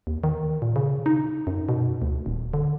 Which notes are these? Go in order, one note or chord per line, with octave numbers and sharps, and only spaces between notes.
D#2
D#3
A#2
C#3
D#4
F#2
B2
D2
D#1
D3